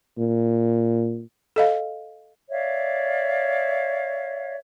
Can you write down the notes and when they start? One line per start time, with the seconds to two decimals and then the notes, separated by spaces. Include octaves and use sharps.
0.18 A#2
1.56 A4 D#5 F5
2.50 C#5 D5 E5 F5